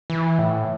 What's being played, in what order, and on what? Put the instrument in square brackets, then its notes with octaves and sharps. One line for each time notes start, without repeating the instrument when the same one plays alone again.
[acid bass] E3
A2